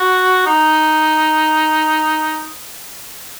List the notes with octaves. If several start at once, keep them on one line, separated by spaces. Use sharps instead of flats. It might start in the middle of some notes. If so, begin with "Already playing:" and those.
Already playing: F#4
D#4